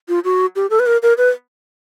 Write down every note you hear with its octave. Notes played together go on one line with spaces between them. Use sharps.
F4
F#4
G4
A4
B4
A#4
A#4
B4